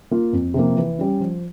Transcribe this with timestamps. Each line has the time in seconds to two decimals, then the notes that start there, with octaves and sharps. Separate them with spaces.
0.11 A#3 F4
0.33 F2
0.54 C3 F3 A#3
0.77 E3
0.99 G3 C#4
1.20 F3